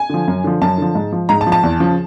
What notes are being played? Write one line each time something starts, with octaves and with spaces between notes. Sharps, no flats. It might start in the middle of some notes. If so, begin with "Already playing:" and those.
Already playing: G#5
D3 F3
F#2
D3 F3
F#2 A5
D3 F3
G#2
F3
G#2 A#5
A5
F3
A5
E2
C#3 F3